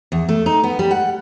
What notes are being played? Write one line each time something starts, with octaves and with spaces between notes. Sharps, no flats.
E2
A3
D#4
B3
G3
F#5